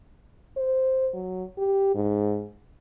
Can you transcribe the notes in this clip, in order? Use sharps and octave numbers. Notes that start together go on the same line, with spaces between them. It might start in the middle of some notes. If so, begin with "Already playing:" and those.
C5
F#3
G4
G#2